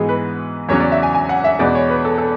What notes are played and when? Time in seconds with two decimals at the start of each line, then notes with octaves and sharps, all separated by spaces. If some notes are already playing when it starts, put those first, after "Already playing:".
Already playing: G#2 E3 G#3 B3 F#4 G#4
0.09 B4
0.68 E2 C#3 F#3 C#4 C#5
0.80 D5
0.92 E5
1.03 G#5
1.14 G#5
1.29 F#5
1.44 E5
1.59 E2 B2 G#3 B3 D5
1.75 C#5
1.89 B4
2.05 A4
2.18 A4